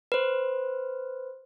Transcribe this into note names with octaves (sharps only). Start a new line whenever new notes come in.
B4 C5